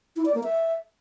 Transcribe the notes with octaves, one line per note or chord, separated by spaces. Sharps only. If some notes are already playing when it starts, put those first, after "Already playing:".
E4
D5
A#3
E5